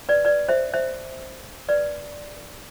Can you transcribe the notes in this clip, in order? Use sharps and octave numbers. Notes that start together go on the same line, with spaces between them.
B4 D5
B4 D5
C5 E5
C5 E5
B4 D5